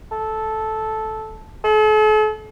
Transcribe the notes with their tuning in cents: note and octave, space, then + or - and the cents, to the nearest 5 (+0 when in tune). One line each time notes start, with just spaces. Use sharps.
A4 -10
A4 -45